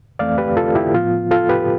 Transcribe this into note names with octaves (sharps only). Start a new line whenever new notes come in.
F2 E3 A3 C4 D5 F5
G4 B4
F4 A4
E4 G4
A2 F3 B3 F4
F4 A4
G4 B4